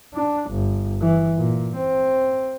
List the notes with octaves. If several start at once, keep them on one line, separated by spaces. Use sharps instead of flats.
D4
G1
E3
A#2
C4